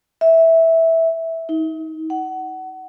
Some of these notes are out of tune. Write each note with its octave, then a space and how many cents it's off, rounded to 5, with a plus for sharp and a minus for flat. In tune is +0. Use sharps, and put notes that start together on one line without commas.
E5 -10
D#4 +35
F#5 +20